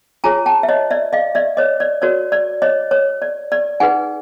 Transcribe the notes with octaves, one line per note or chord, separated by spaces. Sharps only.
F4 G#4 C#5 G#5 A#5
G5 A5
E5
C#5 D#5
D5 E5
D#5 F5
D5 E5
C#5 D#5
D5
F#4 A#4 C#5 D5
D5
C#5 D#5
C#5
D5
D5
D#4 G#4 B4 F#5 G#5